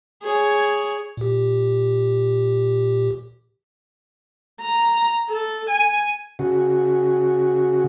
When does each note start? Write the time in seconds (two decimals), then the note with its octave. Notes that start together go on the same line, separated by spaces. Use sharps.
0.22 G#4 C#5
1.17 A#2 G4
4.61 A#5
5.29 A4
5.69 G#5
6.39 C#3 F#4